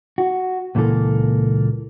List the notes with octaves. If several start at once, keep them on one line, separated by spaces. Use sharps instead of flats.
F#4
C#2 A#2 E3 A#3 A4